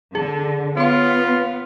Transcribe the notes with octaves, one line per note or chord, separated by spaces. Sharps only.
D3 G#4
B3 F4 C#5 C6